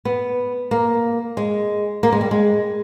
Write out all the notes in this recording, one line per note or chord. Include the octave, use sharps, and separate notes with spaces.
B3
A#3
G#3
A#3
G#3
G3
G#3